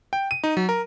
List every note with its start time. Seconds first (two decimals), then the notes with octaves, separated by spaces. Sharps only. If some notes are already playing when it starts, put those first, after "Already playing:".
0.13 G5
0.31 D#7
0.44 D#4
0.57 F#3
0.69 A#4